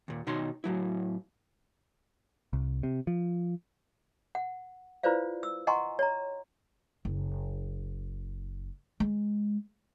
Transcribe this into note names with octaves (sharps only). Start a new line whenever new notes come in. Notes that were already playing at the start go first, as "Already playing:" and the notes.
D#2 A#2
B2 D#3 D#4 C#5 C6
A2 F#3 E4
C2
C3
F3
F#5
E4 F4 B4 C5 D5 F5
E6
D#5 F#5 G#5 A#5 C6 C#6
C#5 A#5
F#1
G#3